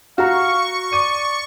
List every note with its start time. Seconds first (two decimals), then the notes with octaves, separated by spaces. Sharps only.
0.18 F#4 F5 A#5 C#6
0.93 D5 D#7